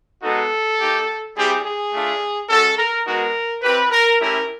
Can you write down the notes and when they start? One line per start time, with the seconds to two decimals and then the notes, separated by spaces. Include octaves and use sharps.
0.22 G#3 B3 D#4 F#4 A4
0.79 A#3 D#4 G4
1.36 G3 C4 E4 G4 G#4
1.64 G#4
1.93 A3 D4 F4
2.49 G#3 C#4 F#4 A4
2.78 A#4
3.06 G#3 B3 D#4 F#4 A#4
3.62 C4 E4 G4 B4
3.91 A#4
4.19 A3 C#4 E4 G4 A#4